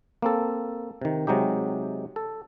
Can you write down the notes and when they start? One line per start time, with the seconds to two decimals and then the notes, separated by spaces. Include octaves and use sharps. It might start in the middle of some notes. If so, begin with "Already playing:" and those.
0.22 A#3 C4 A4
1.02 C3 D#3
1.27 C3 F#3 G#3 D#4 G4
2.16 A4